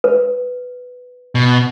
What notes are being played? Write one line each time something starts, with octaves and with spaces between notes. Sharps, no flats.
B4
B2